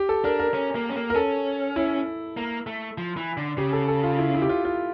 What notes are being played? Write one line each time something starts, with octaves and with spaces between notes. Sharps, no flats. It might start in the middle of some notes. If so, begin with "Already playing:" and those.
Already playing: G4
A4
D4 A#4
A#4
C#4
A#3
C#4
A#3
A#4
C#4 A4
E4
A#3
A3
F3
E3
D3
C#3 G4
A4
A4
F4
E4
E4
G4
F4
F4